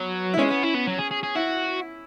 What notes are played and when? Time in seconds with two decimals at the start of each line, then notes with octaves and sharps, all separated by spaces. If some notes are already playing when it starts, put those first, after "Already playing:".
Already playing: F#3 B3
0.34 E4
0.38 G#3 C#4
0.50 B3
0.63 E4
0.75 B3
0.87 F#3
0.99 G#4
1.11 G#4
1.23 G#4
1.35 E4 F#4